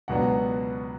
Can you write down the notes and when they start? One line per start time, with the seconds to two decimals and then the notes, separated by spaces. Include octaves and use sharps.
0.08 C#2 B2 F#3 B3 D4 F#5